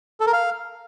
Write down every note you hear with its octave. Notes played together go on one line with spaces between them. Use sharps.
A4
A#4
F5